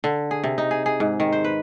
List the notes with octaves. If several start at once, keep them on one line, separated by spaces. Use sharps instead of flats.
D3
G#4
C3
D#4
G#4
G#4
G#2
D#3
C5
B4